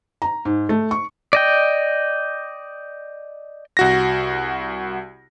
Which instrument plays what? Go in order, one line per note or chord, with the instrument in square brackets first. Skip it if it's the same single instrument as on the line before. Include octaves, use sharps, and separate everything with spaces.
[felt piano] A#5
G#2
A3
C#6
[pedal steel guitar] D5 D#5 G5
[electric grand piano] C2 F#4 A#6